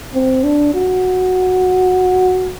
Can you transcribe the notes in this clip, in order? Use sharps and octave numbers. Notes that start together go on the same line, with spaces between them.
C4
D4
F#4